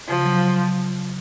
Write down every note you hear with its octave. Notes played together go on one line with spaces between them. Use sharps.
C#3 F3
F#3